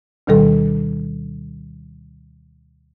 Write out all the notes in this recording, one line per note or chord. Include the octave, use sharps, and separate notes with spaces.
D2 B2 D#3 G3 A4